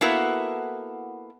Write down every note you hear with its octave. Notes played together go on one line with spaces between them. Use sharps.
A#3 B3 E4 F#4 A4